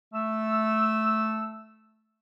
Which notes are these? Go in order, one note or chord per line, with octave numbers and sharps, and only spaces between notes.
A3 E6